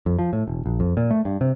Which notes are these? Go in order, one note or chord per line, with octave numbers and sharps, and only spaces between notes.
F2
F3
A2
E1
A#1
F2
A#2
A3
G2
C3